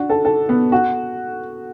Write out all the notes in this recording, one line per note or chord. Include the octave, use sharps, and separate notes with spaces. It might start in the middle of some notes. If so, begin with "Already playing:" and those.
Already playing: D4 F#4
A4
A4
B3
F#4